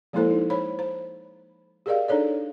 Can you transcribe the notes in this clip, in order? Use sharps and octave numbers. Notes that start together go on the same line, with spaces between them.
F3 G#3 A#3 E4 A4 C5
D#4
C5 C#5 B5
C5
G4 G#4 A#4 D5 D#5 F5
D4 D#4 A4 C#5 D5